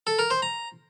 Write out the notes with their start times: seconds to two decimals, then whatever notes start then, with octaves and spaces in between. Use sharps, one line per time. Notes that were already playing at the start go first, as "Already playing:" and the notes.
0.07 A4
0.19 A#4
0.31 C5
0.42 A#5